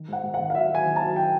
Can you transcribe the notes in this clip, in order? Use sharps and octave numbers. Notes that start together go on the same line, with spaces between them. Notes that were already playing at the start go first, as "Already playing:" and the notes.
Already playing: D#3
G#2 F#5
G#2
F#5
D#3
F5
F#3 E5
F#3 G#5
D#3
A5
F#3
G5